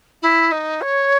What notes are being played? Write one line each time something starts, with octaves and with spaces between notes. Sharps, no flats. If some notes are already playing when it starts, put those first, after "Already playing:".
E4
D#4
C#5